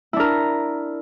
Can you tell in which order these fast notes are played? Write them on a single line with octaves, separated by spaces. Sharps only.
E4 D4 A#4